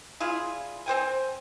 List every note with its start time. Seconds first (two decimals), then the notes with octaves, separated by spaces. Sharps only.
0.20 D4 E4 F4 G#4
0.86 C4 C5 G5 G#5